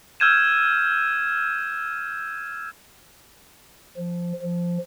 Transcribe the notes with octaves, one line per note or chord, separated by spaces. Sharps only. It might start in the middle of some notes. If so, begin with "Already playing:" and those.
E6 F6 G6 G#6 D#7 E7
F3
F3